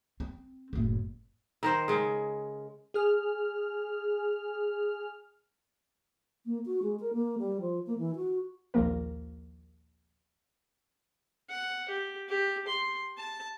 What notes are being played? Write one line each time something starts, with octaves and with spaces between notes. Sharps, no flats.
C4
F#1 A2
D#3 A#4 C5
C#3 G#3
G#4 F6
A#3
F#4
G#3
A#4
A#3
G3
F3
A#3
E3
F#4
A#1 D#2 F3 A#3 A#4
F#5
G4
G4
C6
A5